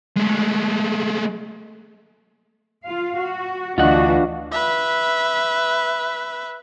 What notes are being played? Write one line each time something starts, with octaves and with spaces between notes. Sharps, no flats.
G#3 A3
F4 F5
F#4
D2 E3 D4 F4 F#4 D#5 F#5 F#6
B4 E5